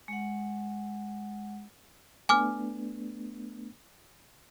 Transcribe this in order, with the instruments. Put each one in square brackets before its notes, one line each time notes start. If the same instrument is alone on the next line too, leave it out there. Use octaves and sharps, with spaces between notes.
[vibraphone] G#3 F#5
[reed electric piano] A3 B3 D4 [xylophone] G#5 D6 F6